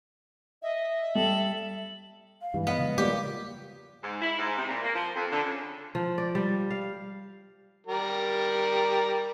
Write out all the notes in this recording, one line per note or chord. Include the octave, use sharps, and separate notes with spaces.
D#5 E5
G3 A4 F#7
F5
G2 E3 G3
B3 D#5 F5
C#3 F3 G#3
G3 A#3 F4 G4 D5
G#2
E4
G#2
C3
A#2
A#3
F3
F2
D3
C#3
F3
D5
G3
F5
G3 A#4